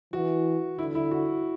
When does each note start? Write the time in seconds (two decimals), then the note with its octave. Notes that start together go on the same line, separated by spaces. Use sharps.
0.13 E3 F#4
0.79 D3 E4
0.95 E4
1.11 F#4